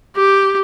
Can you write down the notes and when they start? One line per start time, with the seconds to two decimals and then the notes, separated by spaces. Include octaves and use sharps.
0.16 G4